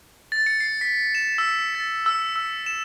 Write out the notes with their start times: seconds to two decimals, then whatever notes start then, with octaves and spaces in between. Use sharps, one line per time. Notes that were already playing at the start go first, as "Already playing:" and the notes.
0.32 A6
0.46 C#7
0.60 C7
0.81 B6
1.15 E7
1.38 E6
1.75 A6
2.06 E6
2.36 E6
2.66 E7